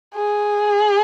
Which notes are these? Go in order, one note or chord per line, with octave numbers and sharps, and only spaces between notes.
G#4